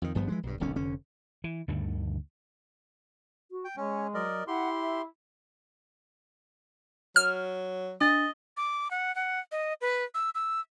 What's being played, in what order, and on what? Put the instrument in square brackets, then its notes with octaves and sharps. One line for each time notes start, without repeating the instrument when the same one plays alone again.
[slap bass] F2 D#3
G#1 G2 F3 B3
E3 F3 G#3 D4
B1 G2
D#1 B1 D3 C#4
F1 D3 C#4
E3
D2 G2 D3 D#3
[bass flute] F#4
[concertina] G5
[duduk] G#3 [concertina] C#4 [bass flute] C#5
[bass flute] F#3 [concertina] A#4 D5 D#5
[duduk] E4 [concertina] G4 C6 [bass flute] F#5
[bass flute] E5
[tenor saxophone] F#3 [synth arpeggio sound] F6
[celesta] D4 A6 [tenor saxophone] D#5
[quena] D6
F#5
F#5
D#5
B4
E6
E6